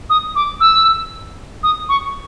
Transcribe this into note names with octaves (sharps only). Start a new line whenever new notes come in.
D#6
D6
E6
D#6
C#6